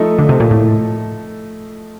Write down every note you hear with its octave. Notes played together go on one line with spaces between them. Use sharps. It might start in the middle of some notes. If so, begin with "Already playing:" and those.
Already playing: F3 A3 D#4 A4
D3
C3
A#2
A2